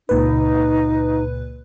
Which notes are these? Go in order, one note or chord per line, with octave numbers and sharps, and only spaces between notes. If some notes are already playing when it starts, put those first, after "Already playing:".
C#2 A#2 D#4 B4